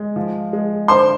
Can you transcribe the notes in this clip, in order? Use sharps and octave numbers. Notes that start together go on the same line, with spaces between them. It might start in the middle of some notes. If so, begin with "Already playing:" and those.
Already playing: G#3
F3
G#3
D3 C5 C6